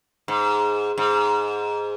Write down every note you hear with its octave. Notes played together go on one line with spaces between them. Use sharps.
G#2
G#2